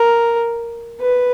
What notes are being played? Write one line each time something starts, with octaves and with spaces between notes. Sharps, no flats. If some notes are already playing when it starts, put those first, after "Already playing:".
Already playing: A#4
B4